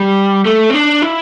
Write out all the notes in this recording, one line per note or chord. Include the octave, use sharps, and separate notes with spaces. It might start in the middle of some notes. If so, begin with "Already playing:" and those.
Already playing: G3
A3
C4
D4
E4